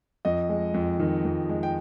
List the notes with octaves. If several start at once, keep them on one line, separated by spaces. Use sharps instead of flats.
F2 D#5
G#3
F2
D#3
F2
G#3
G5